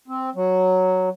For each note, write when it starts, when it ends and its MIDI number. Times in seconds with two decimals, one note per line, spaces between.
0.08 0.30 60
0.35 1.09 54